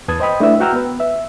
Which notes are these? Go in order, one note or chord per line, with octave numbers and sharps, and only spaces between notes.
E2 B4 A5 D#6 G#6
C5 D#5 G5 B5 D#6
A3 D4 E4 B4 E5
F#4 F#5 G5 A#5 E6 F6
B3 B4
E5